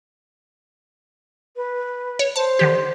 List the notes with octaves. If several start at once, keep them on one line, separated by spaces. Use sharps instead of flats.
B4
C#5
C5 A5
D3 D#3 G4